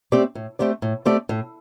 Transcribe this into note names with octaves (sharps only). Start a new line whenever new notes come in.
A3 C4 G4 D5
A2
A3 C4 G4 D5
A2
A3 C4 G4 D5
A2